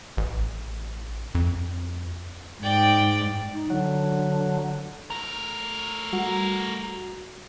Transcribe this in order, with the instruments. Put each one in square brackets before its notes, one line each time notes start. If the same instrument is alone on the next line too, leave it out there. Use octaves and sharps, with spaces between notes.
[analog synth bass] A1
F2
[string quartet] G#2 [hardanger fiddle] D5 G5
[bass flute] D#4
[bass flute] D3 [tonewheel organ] F#3
[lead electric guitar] A3 A#4
[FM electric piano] G3 F#4